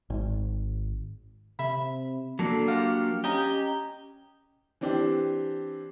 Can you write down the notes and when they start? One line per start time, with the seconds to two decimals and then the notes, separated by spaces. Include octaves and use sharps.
0.10 G#1
1.59 C3 E5 B5
2.39 F#3 A#3 D4 A4
2.68 F4 G4 F#5 F6
3.24 C#4 G4 D#5 G#5 A#5
4.81 E3 C4 D4 G4